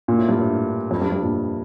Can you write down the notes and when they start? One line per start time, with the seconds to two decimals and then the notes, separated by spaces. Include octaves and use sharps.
0.08 A#2
0.18 A2
0.29 G2
0.39 A2
0.91 F2
1.02 G2
1.12 G2
1.23 A#2